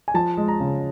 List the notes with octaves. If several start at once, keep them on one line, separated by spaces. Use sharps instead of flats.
G#5
F3 A5
G#3
A#5
C#3